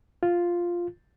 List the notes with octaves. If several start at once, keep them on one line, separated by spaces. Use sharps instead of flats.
F4